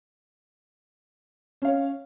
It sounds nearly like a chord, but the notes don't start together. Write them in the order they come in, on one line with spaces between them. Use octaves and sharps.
C#4 F5 C#5